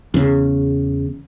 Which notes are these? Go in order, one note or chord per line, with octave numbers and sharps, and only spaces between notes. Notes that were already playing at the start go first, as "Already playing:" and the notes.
E2 C#3